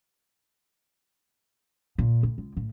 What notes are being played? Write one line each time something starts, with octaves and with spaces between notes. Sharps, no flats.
A#2
D2
C#2
A2